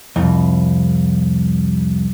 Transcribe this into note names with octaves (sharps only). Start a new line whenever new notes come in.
C2 F2